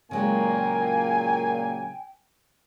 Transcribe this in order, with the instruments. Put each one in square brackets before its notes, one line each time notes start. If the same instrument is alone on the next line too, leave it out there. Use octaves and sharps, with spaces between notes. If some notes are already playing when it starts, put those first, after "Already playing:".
[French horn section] A#2 A#3 [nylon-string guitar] C#3 F#3 G#3 [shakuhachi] G5 [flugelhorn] G#5